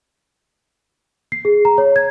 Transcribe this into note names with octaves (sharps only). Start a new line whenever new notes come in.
C7
G#4
A#5
C#5
G#6